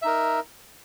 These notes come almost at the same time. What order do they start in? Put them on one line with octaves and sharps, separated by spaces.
E5 D#4 A#4